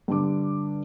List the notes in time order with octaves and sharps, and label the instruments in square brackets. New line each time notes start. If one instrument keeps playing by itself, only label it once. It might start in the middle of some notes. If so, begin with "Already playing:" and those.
[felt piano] G2 D3 D6